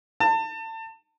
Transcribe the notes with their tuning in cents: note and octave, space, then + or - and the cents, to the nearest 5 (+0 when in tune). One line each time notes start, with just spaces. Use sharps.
A5 +30